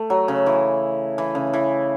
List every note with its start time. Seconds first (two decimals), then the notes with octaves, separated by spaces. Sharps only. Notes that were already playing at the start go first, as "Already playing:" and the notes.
Already playing: A3
0.10 F#3
0.28 C#3
0.46 E3
1.18 E3
1.35 C#3
1.53 E3